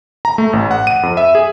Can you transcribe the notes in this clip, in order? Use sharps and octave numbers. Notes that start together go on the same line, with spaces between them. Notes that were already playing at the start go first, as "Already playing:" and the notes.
A#5
A3
A1
F#5
D#7
F2
E5
G#4